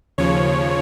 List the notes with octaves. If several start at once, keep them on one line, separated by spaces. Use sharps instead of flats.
D#2 C#3 F3 C#5